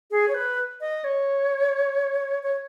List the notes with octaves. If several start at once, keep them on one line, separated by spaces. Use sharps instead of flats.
G#4
C#5
B4
D#5
C#5
C#5